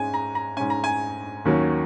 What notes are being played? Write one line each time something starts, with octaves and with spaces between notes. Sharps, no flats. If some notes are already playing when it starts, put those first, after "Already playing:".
Already playing: G#2 G#3 C#4 G#5
A#5
A#5
G#2 G#3 C#4 G#5
A#5
G#5
D#2 D#3 F#3 C#4